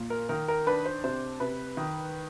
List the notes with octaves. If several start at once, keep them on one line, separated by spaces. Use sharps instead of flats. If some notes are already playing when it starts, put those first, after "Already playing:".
Already playing: A#2
A#4
D#3 A#4
A#4
D4 B4
C5
C3 C5
C3 B4
D#3